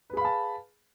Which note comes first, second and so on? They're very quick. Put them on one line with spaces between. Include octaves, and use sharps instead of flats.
B4 G#4 B5 F5 A5